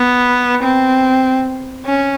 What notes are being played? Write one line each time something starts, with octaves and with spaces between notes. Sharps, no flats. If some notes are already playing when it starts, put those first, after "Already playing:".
Already playing: B3
C4
C#4